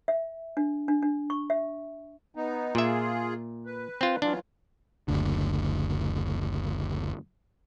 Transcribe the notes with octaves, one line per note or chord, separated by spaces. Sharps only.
E5
D4
D4
D4
C#6
E5
B3 D#4
A#2 F4 G#4 E5
B4
C4 F4
E3 F#3 D4 F4
F#1 D2 D3